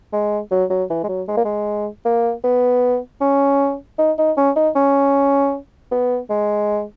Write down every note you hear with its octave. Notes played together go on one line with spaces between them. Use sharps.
G#3
F#3
F#3
E3
G#3
F#3
G#3
A#3
G#3
A#3
B3
C#4
D#4
D#4
C#4
D#4
C#4
B3
G#3